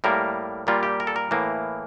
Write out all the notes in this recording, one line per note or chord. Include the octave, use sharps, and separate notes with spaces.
A2 G3 A#3 A#4
A#2 G3 A#3 F4
G4
A#4
A4
A#4
A2 E3 A#3